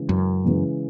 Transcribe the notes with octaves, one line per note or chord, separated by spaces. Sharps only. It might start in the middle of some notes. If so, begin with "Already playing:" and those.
Already playing: C#3 E3 G#3
F#2
C#3 E3 G#3